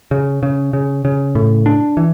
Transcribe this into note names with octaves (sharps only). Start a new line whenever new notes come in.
C#3
C#3
C#3
C#3
A2
D4
E3